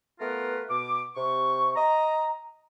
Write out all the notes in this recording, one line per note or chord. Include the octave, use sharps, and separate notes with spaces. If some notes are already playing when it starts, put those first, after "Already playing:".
A3 B3 F4 A#4 B4
B2 D6
C3 C#6
D#5 A#5